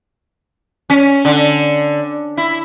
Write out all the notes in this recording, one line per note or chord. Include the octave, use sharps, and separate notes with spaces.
C#4
D3
E4